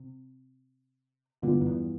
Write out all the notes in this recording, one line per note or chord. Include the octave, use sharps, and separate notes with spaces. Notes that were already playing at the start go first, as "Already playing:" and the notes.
Already playing: C3
G2 D3 E3 B3 F4
F2
E2